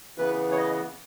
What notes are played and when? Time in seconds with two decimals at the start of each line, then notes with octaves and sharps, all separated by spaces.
0.18 C#3 E3 B3 B4
0.52 C#5
0.57 D#5